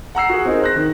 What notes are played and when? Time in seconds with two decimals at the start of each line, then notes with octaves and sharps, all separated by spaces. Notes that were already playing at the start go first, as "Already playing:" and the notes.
0.15 F#5 A#5 E6 C7
0.30 F#4 G#4
0.45 C4 D#4 G#4 A#4
0.62 C5 F#6 A#6
0.76 D#3